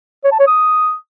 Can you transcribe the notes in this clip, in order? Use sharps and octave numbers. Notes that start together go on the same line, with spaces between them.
C#5
A5
C#5
D#6